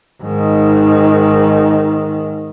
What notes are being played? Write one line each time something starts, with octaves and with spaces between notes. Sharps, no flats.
G#2 D#3